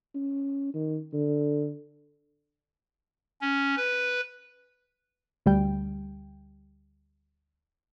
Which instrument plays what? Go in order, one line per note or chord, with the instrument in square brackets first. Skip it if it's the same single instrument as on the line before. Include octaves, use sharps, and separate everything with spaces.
[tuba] C#4
D#3
D3
[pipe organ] C#4
B4
[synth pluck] D2 G3 G5